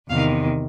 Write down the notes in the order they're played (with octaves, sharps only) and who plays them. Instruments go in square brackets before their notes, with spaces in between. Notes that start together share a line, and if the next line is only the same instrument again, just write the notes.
[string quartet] E2 C3 D#3 F5